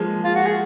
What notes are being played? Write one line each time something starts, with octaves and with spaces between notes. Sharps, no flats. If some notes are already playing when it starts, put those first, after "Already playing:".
Already playing: F3 G#3 A#3
F4
F#4
G#4